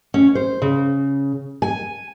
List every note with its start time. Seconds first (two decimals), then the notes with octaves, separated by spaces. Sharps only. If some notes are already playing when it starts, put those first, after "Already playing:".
0.14 C#4
0.35 C5
0.62 C#3
1.62 G#5